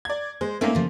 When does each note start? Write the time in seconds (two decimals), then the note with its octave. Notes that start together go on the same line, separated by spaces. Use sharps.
0.05 D5 G#6
0.41 G#3 C5
0.61 A3 A#3 C4 C#4 D#4
0.75 C#3 F3